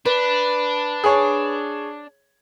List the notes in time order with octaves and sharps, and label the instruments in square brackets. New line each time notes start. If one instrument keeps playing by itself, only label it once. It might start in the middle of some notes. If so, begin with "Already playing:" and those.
[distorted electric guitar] D4 [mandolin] B4
[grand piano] G#4 C#5